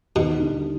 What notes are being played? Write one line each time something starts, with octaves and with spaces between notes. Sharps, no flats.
D#2 B2
D3 G3